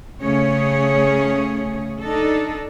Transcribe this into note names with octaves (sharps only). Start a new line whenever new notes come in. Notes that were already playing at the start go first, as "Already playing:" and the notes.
C#3 A3 C#4 G#4 C#5
D4 D#4 A4